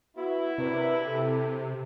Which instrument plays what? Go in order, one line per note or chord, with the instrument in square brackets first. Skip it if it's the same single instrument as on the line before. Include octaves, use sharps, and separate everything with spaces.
[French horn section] B3 F#4 [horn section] E4
[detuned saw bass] C3 [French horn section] D4 A#4 B4
[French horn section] G4 A4